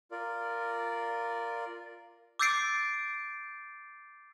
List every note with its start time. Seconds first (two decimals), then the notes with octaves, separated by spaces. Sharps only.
0.11 F4 A#4 D5
2.39 D6 E6 G6 A6 C7 D7